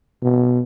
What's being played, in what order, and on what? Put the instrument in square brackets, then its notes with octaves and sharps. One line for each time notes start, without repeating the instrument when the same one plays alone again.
[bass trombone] B2